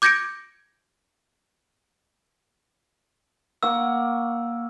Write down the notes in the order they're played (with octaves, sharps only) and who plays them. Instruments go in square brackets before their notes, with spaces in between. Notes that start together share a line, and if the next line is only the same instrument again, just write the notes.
[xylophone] D6 G6 G#6 A#6 C#7 D7
[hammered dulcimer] A#3 F#5 C#6 [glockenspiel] E6